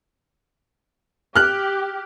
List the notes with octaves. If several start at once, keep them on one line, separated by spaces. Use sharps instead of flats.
G4 F6 F#6